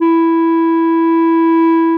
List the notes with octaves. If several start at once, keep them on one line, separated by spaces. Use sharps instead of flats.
E4